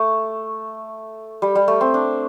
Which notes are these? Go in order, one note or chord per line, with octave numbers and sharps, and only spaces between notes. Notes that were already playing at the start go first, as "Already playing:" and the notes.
Already playing: A3
G3
G3
A3
C4
D4